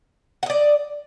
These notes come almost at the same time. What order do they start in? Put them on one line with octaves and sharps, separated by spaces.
F#5 D#5 D5